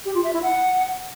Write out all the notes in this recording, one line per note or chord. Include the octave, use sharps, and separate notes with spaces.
G4
F4
E5
E4
F#5